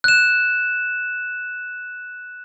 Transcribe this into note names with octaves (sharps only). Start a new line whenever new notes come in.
F#6 E7